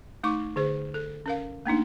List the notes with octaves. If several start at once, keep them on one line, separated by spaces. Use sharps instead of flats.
A3 D#4 C#6 D6
D3 G#4 C5
A4
C#4 A#4 F5
A3 A#3 D4 D#4